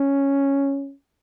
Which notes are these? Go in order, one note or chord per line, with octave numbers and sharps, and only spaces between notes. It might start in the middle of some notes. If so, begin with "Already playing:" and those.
Already playing: C#4